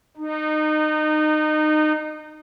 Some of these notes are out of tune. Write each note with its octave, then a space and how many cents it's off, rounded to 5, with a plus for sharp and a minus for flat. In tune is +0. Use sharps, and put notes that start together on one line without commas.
D#4 -25